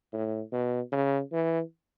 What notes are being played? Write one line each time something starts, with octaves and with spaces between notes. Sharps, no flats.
A2
B2
C#3
E3